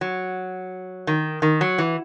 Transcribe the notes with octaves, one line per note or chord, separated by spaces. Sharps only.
F#3
D#3
D#3
F#3
E3